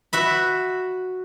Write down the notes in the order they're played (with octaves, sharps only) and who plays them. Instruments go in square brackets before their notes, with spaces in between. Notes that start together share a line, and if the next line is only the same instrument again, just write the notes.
[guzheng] F#4 E5 B5